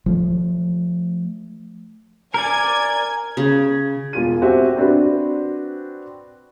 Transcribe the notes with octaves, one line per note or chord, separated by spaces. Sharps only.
F3 A3
A#4 D5 G#5 G#6
C#3
E1 F4 D#7
C4 F#4 G4 C5 E5
C4 D4 F#4 B4